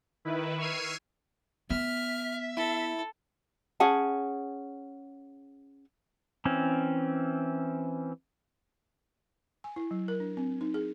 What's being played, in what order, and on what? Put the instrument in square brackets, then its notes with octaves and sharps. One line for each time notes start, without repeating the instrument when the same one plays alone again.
[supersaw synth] D#3 E4 B4
C#6 E6 F6 G#6 C7 D#7
[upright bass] B3 [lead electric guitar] E5 [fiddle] F6
[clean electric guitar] E4 [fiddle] A4
[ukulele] C#4 G#4 F#5 A5
[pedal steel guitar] E3 C4 C#4
[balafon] G#5
E4
F#3
A#4
D4
C4
D#4
G#4